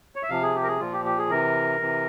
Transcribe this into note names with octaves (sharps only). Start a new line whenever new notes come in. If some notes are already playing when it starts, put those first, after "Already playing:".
C#5
E5
C3 F3 F5
G#4
G4
A#4
G#4
A#2 F3 F4
G4
G4
G#4
C3 E3 A#4
C3 E3